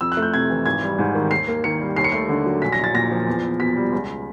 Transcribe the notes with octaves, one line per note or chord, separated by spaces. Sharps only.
F2 E6
F#6
A3
G6
C3 G#6
E3
G#1 G#6
G3
G#2
D#3
D#2 C7
A#3
D#3 C#7
G3
D#2 C7
C#7
A3 C7
D3
F#3
A#1 B6
A#6
A#1 A6
A#2 A#6
F3
E2
E2
B2 B6
G3
C#2